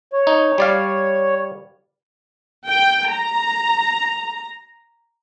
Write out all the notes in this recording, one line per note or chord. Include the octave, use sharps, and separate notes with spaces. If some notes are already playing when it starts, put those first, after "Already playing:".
C#5
D#4
G3 D5 F5
G5
A#5